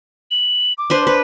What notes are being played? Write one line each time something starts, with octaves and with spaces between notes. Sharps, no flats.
F#7
D6
D4 B4 C5
B4